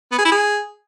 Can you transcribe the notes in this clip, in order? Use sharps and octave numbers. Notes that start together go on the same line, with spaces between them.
B3
G#4
E4
G#4